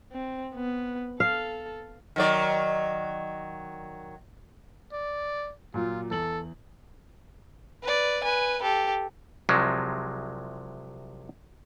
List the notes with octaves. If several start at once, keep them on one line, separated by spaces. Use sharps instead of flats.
C4
B3
A4 F5
D#3 F#3 D5
D5
A#2 F#3 F4
E2 A4 F#7
B4 D5
B4 G#5
G4 A4
C2 C3 F3 F#3 G#3